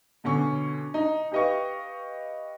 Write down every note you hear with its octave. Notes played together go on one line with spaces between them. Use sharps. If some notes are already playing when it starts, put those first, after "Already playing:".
B2 D3 C#4 C#6
D#4
G4 B4 D#5 F5 C#6